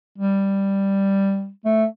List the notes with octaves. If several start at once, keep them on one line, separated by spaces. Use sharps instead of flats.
G3
A3